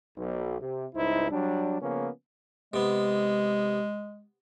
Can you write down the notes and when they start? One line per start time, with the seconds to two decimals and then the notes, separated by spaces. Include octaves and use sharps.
0.17 B1
0.60 C3
0.94 C#2 G2 D#4 E4 C5
1.31 F#3 G3 D4
1.80 C#3 F3 A#3 B3 C#4
2.73 C3 G#3 B3